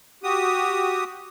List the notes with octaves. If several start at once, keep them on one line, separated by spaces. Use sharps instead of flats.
F#4 G4 D#6